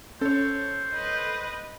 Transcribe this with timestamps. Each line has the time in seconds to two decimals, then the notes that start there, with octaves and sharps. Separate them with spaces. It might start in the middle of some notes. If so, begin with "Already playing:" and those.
0.21 C#4 A4 C5 C#5
0.94 B4 D#5